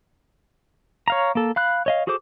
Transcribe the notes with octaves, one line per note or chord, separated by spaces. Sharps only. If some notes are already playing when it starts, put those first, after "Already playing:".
C#5 F5 A#5
A#3 A4
F5 B5 F#6
C#5 D#5 F5
F#4 G#4 A4 C5 D6